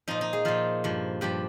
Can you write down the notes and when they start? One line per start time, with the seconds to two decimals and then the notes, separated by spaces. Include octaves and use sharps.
0.08 A#2 F3 D#4
0.21 D#4
0.33 G#4
0.45 A#2 F3 F4
0.84 G2 F3
1.21 G2 F3 G4